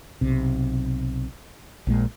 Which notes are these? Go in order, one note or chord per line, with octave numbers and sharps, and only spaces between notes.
B1 C3
A#1 A#2 G#3